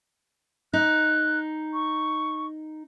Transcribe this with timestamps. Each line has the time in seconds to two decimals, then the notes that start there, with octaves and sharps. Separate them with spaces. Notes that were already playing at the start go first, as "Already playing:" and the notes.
0.73 D#4 F#6
1.73 C#6